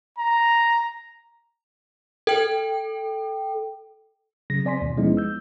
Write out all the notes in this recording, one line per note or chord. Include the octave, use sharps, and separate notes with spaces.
A#5
A4 G5
C#3 F#3 A#6
C4 D5 G#5 C6 B6
D#2 B2
F3 G#3 B3 C#4 D#4 E4
E6 G6